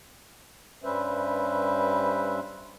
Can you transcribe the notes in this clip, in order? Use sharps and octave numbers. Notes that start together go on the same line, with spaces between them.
G2 G3 C#4 B4 C5 E5